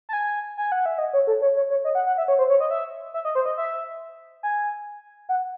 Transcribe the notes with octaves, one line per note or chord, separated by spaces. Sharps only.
A5
G#5
G#5
F#5
E5
D#5
C#5
A4
C#5
C#5
C#5
D#5
F#5
F#5
E5
C#5
C5
C#5
D#5
E5
E5
D#5
C5
D#5
E5
G#5
F#5